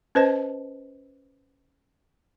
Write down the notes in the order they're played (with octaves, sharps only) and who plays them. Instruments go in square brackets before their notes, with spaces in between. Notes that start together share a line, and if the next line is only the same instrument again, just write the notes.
[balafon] C#4 B4 C5 D#5 A5